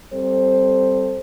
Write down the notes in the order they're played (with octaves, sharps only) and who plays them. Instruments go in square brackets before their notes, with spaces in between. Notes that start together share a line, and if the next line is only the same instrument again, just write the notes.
[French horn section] G3 C4 A4 C5